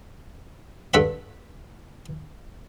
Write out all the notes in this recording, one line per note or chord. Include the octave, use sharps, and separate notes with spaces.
G2 A4 B4 F#5 B5